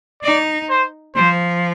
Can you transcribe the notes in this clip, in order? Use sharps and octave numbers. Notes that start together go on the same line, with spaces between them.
D#4 D5
C5
F3 C5